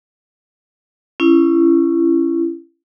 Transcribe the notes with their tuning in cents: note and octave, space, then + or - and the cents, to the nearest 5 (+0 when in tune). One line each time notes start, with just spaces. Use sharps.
C#4 +0 E4 +35